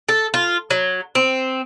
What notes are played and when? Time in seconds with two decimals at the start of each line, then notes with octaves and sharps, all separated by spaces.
0.09 A4
0.34 F4
0.70 F#3
1.15 C4